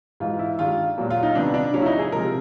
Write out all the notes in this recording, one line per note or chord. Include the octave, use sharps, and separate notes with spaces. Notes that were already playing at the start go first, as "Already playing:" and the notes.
G#2 E3 G#3 F4
E4
G2 D#3 G#3 F4
A#2 F#3 A#3
F4
D#4
C3 D#3 G3 B3 D4
D4
C#3 F#3 A#3 C#4
E4
D#4
G#4
C3 F3 G#3 A#4